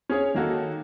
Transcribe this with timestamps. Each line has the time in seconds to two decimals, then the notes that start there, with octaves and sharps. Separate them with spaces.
0.09 C#4 G#4 C#5
0.35 D#3 A#3 F#4 A4